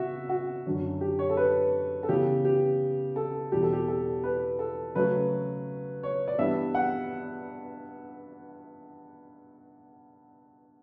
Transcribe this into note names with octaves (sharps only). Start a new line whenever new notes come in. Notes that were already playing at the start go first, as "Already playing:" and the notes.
Already playing: C#3 B3 F#4 E5
F#4
F#2 D3 F#3 C#4
G4
C#5
A4
B4
A4
C#3 E3 B3 G4
G4
A4
E2 B2 G3 G4
A4
G4
A4
B4
A4
C#3 F#3 A3 C#4 B4
C#5
D5
G2 E3 G3 B3 E5
F#5